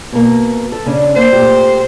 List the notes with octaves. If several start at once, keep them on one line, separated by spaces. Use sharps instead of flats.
B2 A#3
A4
C#3 C#4 D4
A#3 D4 C5
A#2 A3 G4